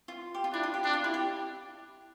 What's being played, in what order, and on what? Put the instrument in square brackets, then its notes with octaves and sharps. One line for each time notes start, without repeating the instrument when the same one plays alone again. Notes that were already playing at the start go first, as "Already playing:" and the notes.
[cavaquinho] F4
G4
F4
[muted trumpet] D4 [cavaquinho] E4
[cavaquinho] F4
G4
[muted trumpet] D4 [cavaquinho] G4
[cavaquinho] F4
E4
G4